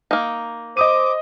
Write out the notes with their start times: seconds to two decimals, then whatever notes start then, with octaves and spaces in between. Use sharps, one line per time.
0.11 A#3 D#4
0.77 C5 D#5 D6 D#6 D#7